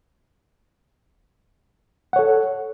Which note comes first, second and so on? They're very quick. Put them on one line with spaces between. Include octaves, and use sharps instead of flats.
F#5 C#5 A4